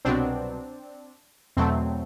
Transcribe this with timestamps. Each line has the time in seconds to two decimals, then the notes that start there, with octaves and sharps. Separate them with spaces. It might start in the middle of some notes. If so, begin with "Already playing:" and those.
0.05 C2 B2 F#3 B3 C4 D4
1.57 E2 B2 F#3 A3 C4